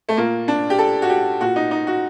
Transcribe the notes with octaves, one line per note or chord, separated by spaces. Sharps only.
A3
A#2 A#3
D4
G4
A4
F#4
G4
A#2 F#4
D#4
D#4
F#4